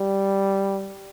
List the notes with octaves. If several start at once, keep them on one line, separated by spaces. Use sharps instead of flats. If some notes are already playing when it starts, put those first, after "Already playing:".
Already playing: G3